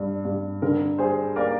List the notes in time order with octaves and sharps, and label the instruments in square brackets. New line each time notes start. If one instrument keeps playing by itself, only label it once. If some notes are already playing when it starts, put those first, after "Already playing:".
Already playing: [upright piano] G2
G2
D3 A#4
G3 G#4 C5
A#3 A#4 D5